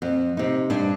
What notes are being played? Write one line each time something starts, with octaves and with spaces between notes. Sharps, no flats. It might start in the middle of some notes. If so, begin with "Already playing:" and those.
F2
C3 D#4
G2 D4